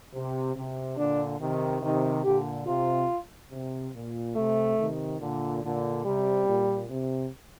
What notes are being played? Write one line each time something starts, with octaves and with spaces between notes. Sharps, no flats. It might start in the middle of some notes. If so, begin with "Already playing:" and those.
C3
C3
A#2 D3 D4
C3 D#3
C3 D#3 D#4
A#2 D3 G4
C3 F4
C3
A#2
C3 A3
C3 D#3
A#2 D3
A#2 D3
C3 G3
A#2
C3